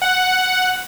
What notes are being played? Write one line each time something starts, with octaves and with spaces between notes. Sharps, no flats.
F#5